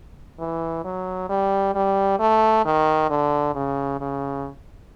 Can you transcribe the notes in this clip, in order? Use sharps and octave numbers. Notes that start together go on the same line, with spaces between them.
E3
F#3
G3
G3
A3
D#3
D3
C#3
C#3